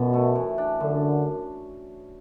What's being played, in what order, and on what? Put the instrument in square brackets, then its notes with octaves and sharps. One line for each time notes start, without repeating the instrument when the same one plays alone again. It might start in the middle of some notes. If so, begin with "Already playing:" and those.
Already playing: [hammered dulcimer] F#2 [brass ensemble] B2
[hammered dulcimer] A3
E3
D4
[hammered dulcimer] F#2 [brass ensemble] D3